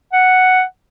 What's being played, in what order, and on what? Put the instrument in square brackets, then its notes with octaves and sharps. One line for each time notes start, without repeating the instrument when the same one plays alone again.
[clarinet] F#5